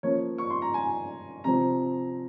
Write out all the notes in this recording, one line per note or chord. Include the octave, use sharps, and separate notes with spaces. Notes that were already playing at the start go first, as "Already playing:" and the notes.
F3 A#3 C#4 C#5
C#6
C6
A#5
G#5
C3 F3 C4 A#5